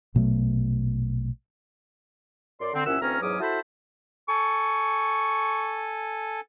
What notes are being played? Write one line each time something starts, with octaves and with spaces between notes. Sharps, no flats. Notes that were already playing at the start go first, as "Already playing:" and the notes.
A#1 B2 F#3 A3
F#2 D5 C6
D3 C4
C2 A#2 C#4 E5 F#5 E6
D2 E3 C4 C#4 F5 A#5
E2 G#2 F#3 C#4 D6 D#6
E4 F#4 A4 C5 A5 B5
A4 G#5 C#6